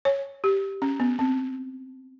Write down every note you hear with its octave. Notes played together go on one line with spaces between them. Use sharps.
C#5
G4
C#4
B3
C4